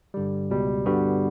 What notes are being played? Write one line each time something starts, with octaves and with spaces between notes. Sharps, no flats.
G2 D3 G3
C#2 B2 G3
G2 D3 G3 B3 F#4